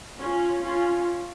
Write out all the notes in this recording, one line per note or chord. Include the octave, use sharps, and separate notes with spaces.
C#4 F4
C#4 F4